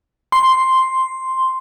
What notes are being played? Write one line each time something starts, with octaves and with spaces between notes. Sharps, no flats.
C6